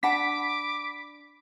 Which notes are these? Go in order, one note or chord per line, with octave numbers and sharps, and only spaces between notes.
D4 F#5 A5 B5 D6 B6